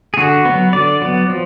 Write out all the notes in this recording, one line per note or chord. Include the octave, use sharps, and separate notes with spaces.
G#4
D3 F#4
F#3 B3
D3 D5
F#3 B3
F3